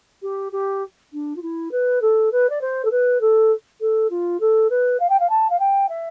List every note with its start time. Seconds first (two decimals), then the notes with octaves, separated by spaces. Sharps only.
0.22 G4
0.52 G4
1.13 D4
1.36 F4
1.42 E4
1.71 B4
2.01 A4
2.32 B4
2.50 D5
2.61 C5
2.85 A4
2.91 B4
3.21 A4
3.81 A4
4.10 F4
4.40 A4
4.70 B4
5.00 F5
5.09 G5
5.20 F5
5.29 A5
5.50 F5
5.59 G5
5.89 E5